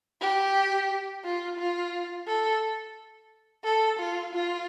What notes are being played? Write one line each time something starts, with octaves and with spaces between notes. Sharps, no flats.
G4
F4
F4
A4
A4
F4
F4